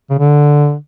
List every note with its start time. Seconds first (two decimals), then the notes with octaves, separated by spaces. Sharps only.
0.11 C#3
0.19 D3